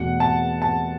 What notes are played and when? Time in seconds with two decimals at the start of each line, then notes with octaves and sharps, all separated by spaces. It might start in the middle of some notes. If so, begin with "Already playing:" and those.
Already playing: E2 B2 A3 F#5
0.20 A5
0.62 A5